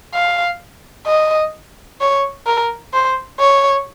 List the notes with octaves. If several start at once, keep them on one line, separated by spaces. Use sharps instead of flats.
F5
D#5
C#5
A#4
C5
C#5